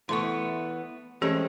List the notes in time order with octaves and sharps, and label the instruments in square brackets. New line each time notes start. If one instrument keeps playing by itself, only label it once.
[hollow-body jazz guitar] E3 A3 B3 [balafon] C6 C#6
[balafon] E3 C#4 G4 [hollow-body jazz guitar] G#3 A3 C4